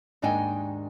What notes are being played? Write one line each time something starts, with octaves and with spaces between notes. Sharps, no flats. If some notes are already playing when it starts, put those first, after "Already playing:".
D#2 G#2 D4 D#4 G5 G#5